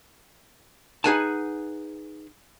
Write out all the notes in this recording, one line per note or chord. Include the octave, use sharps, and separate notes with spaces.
D#4 G#4 B4 F#5 G#5 A5